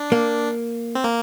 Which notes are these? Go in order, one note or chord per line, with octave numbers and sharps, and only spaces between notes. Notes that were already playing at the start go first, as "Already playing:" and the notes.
Already playing: D4
A#3
C4
A#3